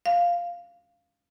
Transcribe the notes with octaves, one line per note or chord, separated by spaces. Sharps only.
F5